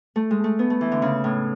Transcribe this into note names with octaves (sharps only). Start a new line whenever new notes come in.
A3
G#3
A3
B3
A3
E3
D3
C#3
A2